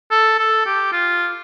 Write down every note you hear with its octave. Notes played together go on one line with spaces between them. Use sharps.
A4
A4
G4
F4